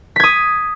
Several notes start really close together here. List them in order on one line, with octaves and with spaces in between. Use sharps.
B6 G#6 D#6